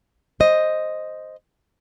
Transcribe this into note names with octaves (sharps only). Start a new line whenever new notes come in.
C5 D#5